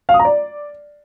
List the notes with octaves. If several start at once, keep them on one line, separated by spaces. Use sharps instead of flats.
F5
D#6
A#5
D5